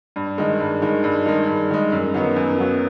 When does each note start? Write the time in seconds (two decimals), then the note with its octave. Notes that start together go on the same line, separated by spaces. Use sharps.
0.16 G2
0.38 D#3 G#3
0.60 G2
0.82 D#3 G#3
1.04 G2
1.26 D#3 G#3
1.48 G2
1.71 D#3 G#3
1.92 F#2
2.14 D#3 F#3 B3
2.36 F#2
2.58 D#3 F#3 B3